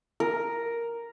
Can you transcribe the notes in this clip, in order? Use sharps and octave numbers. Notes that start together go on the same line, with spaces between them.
A#4